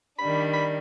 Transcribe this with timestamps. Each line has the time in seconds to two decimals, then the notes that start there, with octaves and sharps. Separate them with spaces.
0.18 D#3 G3 D4 B5
0.53 B5